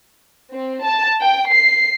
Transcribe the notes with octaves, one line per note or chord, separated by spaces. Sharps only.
C4
A5
G5
C7